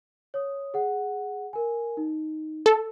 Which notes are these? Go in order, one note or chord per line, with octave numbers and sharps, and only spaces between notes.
C#5 D#6
G#4 F#5
A#4 G#5
D#4
A4